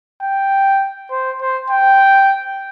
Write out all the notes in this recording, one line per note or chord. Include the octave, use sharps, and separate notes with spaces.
G5
C5
C5
G5